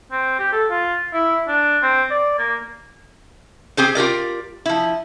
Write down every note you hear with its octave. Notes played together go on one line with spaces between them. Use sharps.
C4
G4
A4
F4
E4
D4
C4
D5
A#3
C4 G4 G#4 C5
F4 G4 A#4 D5
F3 E4